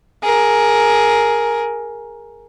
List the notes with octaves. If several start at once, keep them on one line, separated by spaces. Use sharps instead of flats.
G#4 A#4